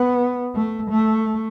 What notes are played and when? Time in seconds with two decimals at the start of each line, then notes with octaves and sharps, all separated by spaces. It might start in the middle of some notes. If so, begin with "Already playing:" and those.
Already playing: B3
0.55 A3
0.90 A3